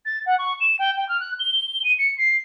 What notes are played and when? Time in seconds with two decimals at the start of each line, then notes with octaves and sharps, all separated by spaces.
0.05 A6
0.26 F#5
0.39 C#6
0.61 E7
0.79 G5
0.97 G5
1.09 F6
1.20 F#6
1.40 G7
1.84 D#7
1.99 C#7
2.18 C7